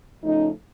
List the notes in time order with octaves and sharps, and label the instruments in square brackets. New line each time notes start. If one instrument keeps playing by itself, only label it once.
[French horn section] C#3 F3 A3 C#4 D#4